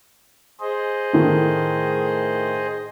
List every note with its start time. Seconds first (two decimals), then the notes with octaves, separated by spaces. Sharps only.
0.60 G#4 C5 D#5
1.13 A2 D#3 A3